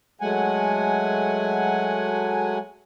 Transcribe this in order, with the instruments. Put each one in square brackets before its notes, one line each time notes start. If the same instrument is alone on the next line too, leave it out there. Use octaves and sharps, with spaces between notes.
[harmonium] F#3 G#3 A3 F#5 G#5